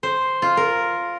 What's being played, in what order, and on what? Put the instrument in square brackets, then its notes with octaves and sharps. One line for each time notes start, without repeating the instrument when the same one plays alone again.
[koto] C5
F4
A#4